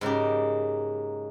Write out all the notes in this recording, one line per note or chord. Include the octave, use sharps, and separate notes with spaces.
G#2 C#3 A#3 G4